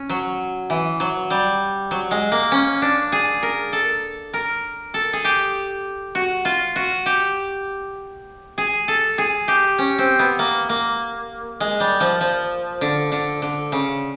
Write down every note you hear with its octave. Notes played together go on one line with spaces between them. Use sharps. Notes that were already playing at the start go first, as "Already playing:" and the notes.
Already playing: C#4
F#3
E3
F#3
G3
F#3
G#3
A#3
C#4
D4
G#4
A#4
A4
A#4
A4
G#4
G4
F#4
F4
F#4
G4
G#4
A4
G#4
G4
C#4
C4
B3
A#3
A#3
G#3
G3
F3
F3
D3
D3
D3
C#3